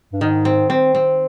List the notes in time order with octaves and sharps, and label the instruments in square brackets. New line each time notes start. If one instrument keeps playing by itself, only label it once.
[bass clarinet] G2
[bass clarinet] G#2 [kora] D#3
[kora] C4
C4
C4